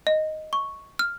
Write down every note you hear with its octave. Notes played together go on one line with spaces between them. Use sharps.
D#5
C#6
F6